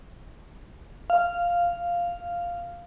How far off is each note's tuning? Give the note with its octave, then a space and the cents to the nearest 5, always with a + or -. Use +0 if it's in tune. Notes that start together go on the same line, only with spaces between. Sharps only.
F5 -5